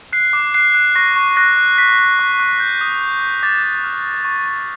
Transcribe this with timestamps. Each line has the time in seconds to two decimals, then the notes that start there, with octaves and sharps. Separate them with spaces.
0.13 F#6 C7
0.33 D6
0.54 F#6 C7
0.74 F#6
0.96 C#6 A#6
1.16 C#6
1.37 F#6 A#6
1.57 F#6
1.77 F#6 B6
1.98 F#6
2.19 C#6
2.40 F#6
2.60 G6
2.81 D#6
3.01 G6
3.22 G6
3.43 D6 A6
3.63 D6
3.84 F6
4.04 D6
4.25 C#6
4.46 C#6